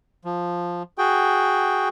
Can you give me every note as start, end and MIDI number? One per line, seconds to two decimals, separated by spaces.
0.25 0.83 53
0.98 1.89 66
0.98 1.89 68
0.98 1.89 79